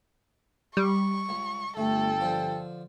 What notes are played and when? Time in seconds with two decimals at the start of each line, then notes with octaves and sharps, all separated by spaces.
0.77 G3 C#6
1.29 C#2
1.77 G1 A3 A4 G5
2.21 D3 F3